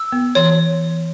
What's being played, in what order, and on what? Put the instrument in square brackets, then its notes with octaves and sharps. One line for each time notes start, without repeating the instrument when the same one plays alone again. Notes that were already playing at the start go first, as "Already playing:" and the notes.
Already playing: [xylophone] E6
[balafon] B3
[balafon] E3 [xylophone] C#5